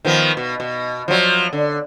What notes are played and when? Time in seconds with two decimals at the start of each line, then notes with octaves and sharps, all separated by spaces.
0.05 D#3 F3 B3
0.37 B2
0.60 B2
1.08 F3 F#3
1.53 D3